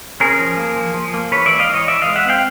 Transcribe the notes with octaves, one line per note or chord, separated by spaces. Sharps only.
C#4 G#4 A#4
F3
A#3
F3
F3
A#3
E3 B4 C#5
G#3 D5 E5
D#5 F5
E3 C#5 D#5
E3 D5 E5
G#3 D#5 F5
E5 F#5
C4 F5 G5